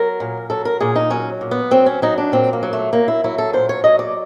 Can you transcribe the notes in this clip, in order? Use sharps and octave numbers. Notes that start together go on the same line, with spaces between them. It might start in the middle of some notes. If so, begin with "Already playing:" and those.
Already playing: F#3 A#4
A#2
F#3 A4
A#4
A#2 G#4
D#4
F#3 C#4
A#2
B3
F#3 C4
C#4
F#3 D#4
D4
A#2 C4
A#3
F#3
A3
F#3 A#3
E4
F#3 E4
A4
A#2 C5
C#5
F#3 D#5
D5